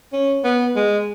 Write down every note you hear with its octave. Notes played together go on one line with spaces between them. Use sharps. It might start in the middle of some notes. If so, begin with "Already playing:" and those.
C#4
B3
G#3